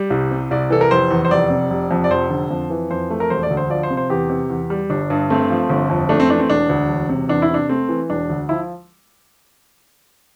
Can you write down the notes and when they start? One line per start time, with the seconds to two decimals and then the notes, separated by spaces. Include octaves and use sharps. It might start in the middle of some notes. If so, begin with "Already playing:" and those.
Already playing: G3
0.10 C2
0.31 C3
0.51 C2 D5
0.70 E3 A4
0.81 A#4
0.91 F1 C5
1.11 E2
1.25 C5
1.31 F1 D5
1.50 C3
1.70 F1
1.91 F2
2.04 D5
2.10 F1 C5
2.30 D3
2.50 F2
2.70 E3
2.91 F2 C5
3.10 A3
3.20 A#4
3.30 E1 C5
3.43 D5
3.50 D2
3.57 C5
3.70 F3 D5
3.83 C5
3.90 C3
3.97 C5
4.10 E2 G4
4.30 C3
4.50 E2
4.70 G3
4.90 G1 D4
5.10 G2
5.30 A3 C4
5.50 F3
5.69 G1
5.90 F2
6.09 A3 D4
6.20 C4
6.29 E3 D4
6.40 C4
6.50 E1 D4
6.69 D2
6.89 E1
7.09 C3
7.29 E2 D4
7.42 E4
7.49 C3 D4
7.69 A3 C4
7.89 E3
8.10 E1 D4
8.29 D2
8.49 F3 E4